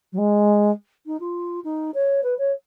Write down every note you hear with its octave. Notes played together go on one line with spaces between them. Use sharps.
F#3
G#3
D#4
F4
D#4
C#5
B4
C#5